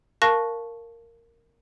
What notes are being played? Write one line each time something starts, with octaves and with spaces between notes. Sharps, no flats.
A#4 F5 A5 C#6 F#6 A#6